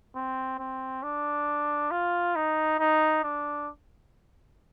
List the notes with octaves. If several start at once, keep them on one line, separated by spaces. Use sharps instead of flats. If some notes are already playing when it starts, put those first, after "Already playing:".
C4
C4
D4
F4
D#4
D#4
D4